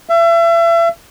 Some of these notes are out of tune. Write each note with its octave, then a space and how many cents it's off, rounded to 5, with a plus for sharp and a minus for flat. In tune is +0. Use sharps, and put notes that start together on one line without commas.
E5 +35